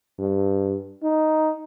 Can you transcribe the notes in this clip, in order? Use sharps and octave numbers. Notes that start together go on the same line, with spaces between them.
G2
D#4